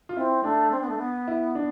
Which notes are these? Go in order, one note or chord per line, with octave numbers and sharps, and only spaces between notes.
F4
C4 E4
A3 D4
C4
B3
A3
B3
E4
D4